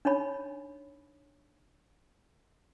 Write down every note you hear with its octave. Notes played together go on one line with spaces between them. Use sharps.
D4 D#4 C#5 B5